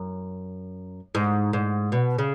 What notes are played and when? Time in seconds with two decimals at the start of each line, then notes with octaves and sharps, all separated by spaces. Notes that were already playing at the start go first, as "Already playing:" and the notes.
Already playing: F#2
1.15 G#2
1.53 G#2
1.92 B2
2.18 C#3